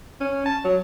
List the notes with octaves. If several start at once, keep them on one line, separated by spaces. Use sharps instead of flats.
C#4
A5
F#3